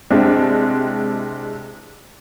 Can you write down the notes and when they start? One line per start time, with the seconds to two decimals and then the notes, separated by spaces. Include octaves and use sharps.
0.10 C2 C3 G#3 C4 D4